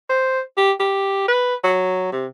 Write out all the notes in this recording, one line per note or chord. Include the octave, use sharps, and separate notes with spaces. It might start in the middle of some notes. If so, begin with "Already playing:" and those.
C5
G4
G4
B4
F#3
C3